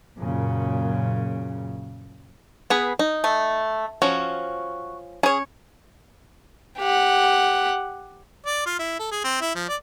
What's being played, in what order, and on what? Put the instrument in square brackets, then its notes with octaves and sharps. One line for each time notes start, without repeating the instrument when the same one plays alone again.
[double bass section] F#2 A#2 C#3
[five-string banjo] B3 G#4 B4
D#4
[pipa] A3
[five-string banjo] F3 C#4 [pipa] F#4
[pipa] C#4 C#5 [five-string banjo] G#4
[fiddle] G4 F#5
[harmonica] D5
F4
E4
A4
G#4
C4
E4
F3
D5